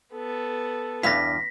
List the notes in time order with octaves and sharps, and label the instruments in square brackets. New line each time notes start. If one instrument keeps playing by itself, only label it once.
[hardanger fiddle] B3 [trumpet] A4
[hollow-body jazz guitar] E2 G2 F5 [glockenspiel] A#6 B6